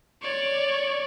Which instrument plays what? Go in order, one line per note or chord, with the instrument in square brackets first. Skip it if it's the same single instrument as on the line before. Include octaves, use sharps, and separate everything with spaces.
[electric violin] C#5 D5